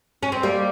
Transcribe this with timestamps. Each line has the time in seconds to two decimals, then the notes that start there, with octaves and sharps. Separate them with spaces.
0.23 C#4
0.32 C4
0.43 G3 A#3